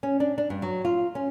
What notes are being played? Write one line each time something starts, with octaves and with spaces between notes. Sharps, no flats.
C#4
D4
D4
G2
F#3
F4
C#4